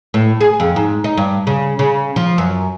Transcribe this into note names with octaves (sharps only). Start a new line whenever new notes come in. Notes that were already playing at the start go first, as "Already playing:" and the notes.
A2
G#4
F2
G#2
D#4
G2
C#3
C#3
F3
F#2